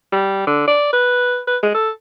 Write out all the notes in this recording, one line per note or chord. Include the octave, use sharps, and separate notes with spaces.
G3
D3
D5
B4
B4
G#3
A4